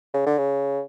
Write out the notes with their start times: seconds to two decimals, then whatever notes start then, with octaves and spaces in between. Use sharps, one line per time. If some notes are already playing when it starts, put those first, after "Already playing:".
0.14 C#3
0.26 D3
0.38 C#3